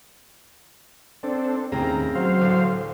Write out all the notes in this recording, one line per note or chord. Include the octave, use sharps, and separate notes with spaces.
C4 D4 A4
D#2 A2 C#3 C4 A#5
F#3 C5 F5
D1 D3